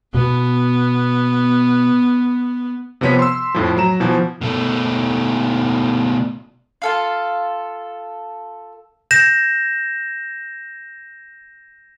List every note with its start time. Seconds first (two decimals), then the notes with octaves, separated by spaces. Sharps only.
0.14 B2 B3
3.01 C3 F3 B3 C#5 B6
3.19 C6 E6
3.55 F2 A2 F3
3.77 F#3 A#5 E7
4.00 B2 E3 F3
4.41 B2 A3
6.82 F4 A4 F5
9.11 G6 A#6 E7